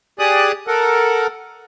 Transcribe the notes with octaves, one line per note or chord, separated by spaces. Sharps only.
G4 G#4 D5 D#6 F#6
A4 A#4 F#5